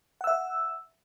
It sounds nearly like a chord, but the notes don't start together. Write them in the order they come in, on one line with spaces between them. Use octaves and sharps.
F#5 E6 E5